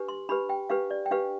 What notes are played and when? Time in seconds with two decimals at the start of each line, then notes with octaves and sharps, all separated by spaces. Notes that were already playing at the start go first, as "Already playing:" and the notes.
Already playing: D4 G4 B4
0.08 C6
0.29 D4 G4 B4 B5
0.49 G5
0.70 D4 G4 B4 F5
0.90 D5
1.06 G5
1.11 D4 G4 B4 F5